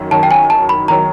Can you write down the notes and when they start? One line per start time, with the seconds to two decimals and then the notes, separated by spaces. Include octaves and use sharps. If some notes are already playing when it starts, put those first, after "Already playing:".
Already playing: F#2 D#3 F#3
0.11 F#2 D#3 F#3 A5
0.23 G5
0.31 G#5
0.50 A5
0.69 B5
0.88 D#3 F#3 A#5